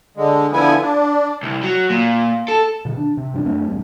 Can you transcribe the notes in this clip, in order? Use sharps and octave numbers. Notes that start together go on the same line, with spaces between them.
D3 G#3
D3 F3 B3 E4 G#5
D4
C2
F#3
A#2
A4
B2 D#3
D4
C3
G2 F3 D4
F#2 A3 C4 D4
E1 G2